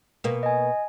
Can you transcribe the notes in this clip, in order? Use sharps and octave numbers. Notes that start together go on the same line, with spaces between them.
B2 A#3
D#5 G#5